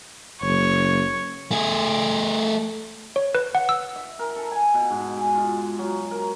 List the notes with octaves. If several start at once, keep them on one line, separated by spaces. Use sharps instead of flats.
F#1 C#5
A3 G#4
C#5
B4
F#5
E6
E5
A#4
A4
G#5
B2
G#2
G#4
F4
F#3
A#4